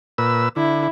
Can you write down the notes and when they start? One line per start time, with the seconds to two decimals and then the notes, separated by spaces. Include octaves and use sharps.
0.18 A#2 B4 E6
0.56 D3 E4